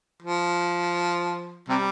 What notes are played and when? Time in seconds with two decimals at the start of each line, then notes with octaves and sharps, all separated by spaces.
0.22 F3
1.69 C3 G3